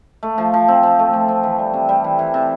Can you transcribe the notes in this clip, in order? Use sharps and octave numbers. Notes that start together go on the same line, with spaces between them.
A3
F3
F3
C4
F3
A3
F3
C4
E3
G3
C3
G3
E3
E3
C3